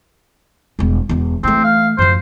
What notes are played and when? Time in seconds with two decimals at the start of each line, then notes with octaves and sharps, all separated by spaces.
0.79 E1 G3
1.09 E1 E2
1.43 E3 A3 C4
1.64 F5
1.98 F#2 F3 C5